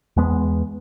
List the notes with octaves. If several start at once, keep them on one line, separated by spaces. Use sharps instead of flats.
E2 G#3 B3